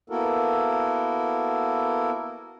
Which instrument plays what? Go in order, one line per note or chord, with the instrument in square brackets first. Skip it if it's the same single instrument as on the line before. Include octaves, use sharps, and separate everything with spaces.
[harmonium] A#3 B3 E4 F#4 A4 A#4